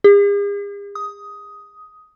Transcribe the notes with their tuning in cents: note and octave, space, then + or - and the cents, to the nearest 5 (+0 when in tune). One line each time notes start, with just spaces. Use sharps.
G#4 -45
D#6 +10